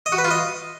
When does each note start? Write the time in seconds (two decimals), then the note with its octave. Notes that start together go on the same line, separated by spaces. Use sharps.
0.06 D#5
0.12 F#4
0.18 B4
0.24 F4
0.31 D#5